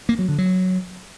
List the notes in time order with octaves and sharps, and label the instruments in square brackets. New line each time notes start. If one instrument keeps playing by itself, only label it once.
[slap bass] A#3
F#3
D3
F#3